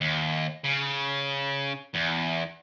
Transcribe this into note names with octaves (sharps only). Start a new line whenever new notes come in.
D#2
C#3
E2